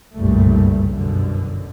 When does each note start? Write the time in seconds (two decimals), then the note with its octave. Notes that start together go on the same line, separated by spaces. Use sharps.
0.15 F#1 C2 G2 A#2 G3 A3
0.91 G1 F#2 B2 D3